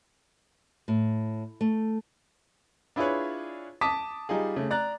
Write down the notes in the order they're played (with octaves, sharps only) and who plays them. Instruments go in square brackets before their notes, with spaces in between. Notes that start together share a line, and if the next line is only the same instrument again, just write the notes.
[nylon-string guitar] A2
A3
[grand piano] D4 E4 F4 G#4 B4 C#5
A5 D6 D#6 B6
G3 D#4 F4 G#4
C#3 A3
D5 A#5 F#6 A6